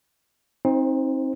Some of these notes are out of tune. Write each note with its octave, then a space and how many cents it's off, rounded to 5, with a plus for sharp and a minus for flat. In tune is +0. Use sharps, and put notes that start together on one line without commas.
C4 +30 D#4 +25 C5 +0